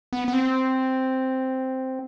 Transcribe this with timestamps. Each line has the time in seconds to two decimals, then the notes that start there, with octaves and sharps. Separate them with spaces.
0.13 B3
0.28 B3
0.33 C4